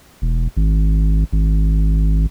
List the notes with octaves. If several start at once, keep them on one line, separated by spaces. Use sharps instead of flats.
E1
G#1
G#1